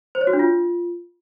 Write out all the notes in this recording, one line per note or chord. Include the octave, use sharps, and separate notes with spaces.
C5
C#5
F#4
D4
F4